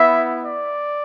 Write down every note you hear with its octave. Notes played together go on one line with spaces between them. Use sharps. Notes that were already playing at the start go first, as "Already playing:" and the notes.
Already playing: B3 E4 E5
D5